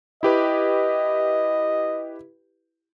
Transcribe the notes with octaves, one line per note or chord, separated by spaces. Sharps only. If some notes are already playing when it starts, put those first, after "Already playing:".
E4 G4 B4 D#5